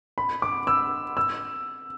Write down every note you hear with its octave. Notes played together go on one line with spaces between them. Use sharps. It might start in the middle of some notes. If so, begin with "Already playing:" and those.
B5
D6
E6
E6